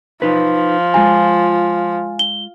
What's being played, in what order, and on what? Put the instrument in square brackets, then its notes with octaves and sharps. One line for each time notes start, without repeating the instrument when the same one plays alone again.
[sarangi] F3 [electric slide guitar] D#4 B4
[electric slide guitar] G#3 F4 A#5 [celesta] G#5
[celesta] G7